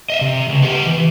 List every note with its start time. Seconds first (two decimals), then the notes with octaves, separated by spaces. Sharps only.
0.10 D#5 E5
0.21 C3
0.49 C#2
0.62 B3 G4
0.87 E3